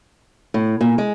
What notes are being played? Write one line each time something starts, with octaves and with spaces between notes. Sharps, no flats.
A2
A#2
G#3